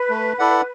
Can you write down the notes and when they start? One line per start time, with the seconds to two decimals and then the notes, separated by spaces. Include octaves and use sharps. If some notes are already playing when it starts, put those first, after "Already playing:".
Already playing: B4
0.09 A3
0.39 E4 A4 D5 F#5